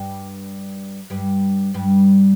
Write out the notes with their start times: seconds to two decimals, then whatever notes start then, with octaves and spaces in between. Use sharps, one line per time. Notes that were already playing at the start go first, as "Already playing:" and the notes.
Already playing: G2 G3
1.10 G2 G3
1.74 G2 G3